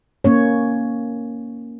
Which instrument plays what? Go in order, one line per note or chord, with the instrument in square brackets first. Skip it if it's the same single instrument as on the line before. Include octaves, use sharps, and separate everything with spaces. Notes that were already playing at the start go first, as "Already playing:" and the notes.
[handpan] A#3 C#4 C#5